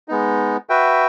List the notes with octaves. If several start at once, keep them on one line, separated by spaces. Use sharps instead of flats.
G#3 B3 D#4
F#4 B4 E5 G5